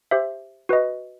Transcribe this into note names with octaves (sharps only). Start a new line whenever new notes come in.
G4 C5 E5
F#4 B4 D#5